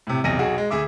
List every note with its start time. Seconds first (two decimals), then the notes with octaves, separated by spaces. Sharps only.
0.07 A2 C3
0.24 B1 E2 C3 A#6 D#7
0.39 B1 F#4 G#4
0.58 G#3
0.70 D2 G#4 E5 D6